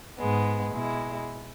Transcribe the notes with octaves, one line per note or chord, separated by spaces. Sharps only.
G#2 G#3 B3
B2 G#3 E4